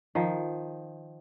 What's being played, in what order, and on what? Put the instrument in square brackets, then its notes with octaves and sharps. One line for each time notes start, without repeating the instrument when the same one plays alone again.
[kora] D#3 F3